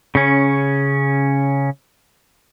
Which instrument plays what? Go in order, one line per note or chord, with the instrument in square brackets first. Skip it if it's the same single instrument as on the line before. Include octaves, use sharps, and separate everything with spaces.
[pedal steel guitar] C#3 C#4